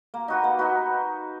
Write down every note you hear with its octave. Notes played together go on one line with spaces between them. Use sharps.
A#3
D#4 F#4 B4
A#3
D#4 F#4 B4